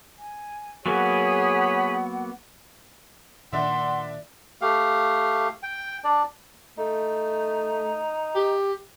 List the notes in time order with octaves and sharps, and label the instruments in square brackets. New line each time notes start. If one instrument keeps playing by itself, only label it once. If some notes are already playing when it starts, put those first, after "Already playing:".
[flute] G#5
[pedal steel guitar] F#3 A#3 B3 [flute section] G#4 G#5 B5 [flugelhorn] C#5 [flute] F#5
[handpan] A#2 D#3 [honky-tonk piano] D4 E5 [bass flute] F#5 [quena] C6
[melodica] A3 G4 F5
G5
D4 D5
[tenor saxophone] A3 [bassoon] D#4
[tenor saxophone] G4